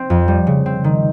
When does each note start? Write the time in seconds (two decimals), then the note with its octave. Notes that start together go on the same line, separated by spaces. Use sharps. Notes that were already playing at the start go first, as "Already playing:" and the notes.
Already playing: C4
0.10 F2
0.28 G3
0.47 C#3
0.66 C4
0.84 D#3